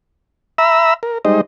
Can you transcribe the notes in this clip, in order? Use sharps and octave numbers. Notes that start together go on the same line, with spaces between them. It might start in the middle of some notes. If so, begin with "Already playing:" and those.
E5 A#5 B5 E6
A#4
G3 G#3 D#4 C5 D#5